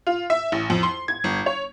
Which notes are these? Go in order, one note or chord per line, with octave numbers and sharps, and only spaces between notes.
F4
E5
A1
F2
C6
G#6
G1
C#5